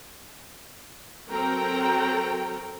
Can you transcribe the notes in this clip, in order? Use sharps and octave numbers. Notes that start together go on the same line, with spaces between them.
F#3 C4 A4 A#4 G5 A#5